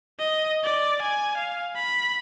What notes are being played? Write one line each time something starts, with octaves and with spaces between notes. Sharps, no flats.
D#5
D5
G#5
F5
B5